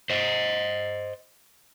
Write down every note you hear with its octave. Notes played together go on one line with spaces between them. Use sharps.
C5 D#5